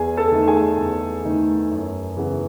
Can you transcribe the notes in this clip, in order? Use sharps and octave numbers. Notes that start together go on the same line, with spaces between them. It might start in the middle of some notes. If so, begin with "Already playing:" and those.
Already playing: E2 G#4 G#5
A4 A5
D#3 A3 D#4
G#4 G#5
E2
D#3 A3 D#4
F#2
C#3 E3 B3